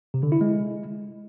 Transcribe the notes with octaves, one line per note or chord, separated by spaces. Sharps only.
C3
D3
E4
G#3